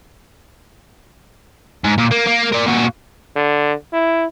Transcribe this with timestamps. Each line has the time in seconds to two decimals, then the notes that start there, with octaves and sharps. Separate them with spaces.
1.84 G#2
1.98 A#2
2.12 A#3
2.27 A#3
2.53 A#4 D5
2.67 A#2 F#4
3.36 D3
3.93 E4